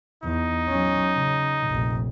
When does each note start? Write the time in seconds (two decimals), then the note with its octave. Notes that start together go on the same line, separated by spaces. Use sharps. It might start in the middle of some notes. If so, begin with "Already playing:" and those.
0.24 E2 D#4
0.68 F#3 C#4
1.16 C#3
1.69 F1 A#1